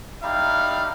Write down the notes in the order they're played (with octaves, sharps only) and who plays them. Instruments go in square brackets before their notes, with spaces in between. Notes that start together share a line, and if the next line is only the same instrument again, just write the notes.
[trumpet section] G3 D#4 E4 F5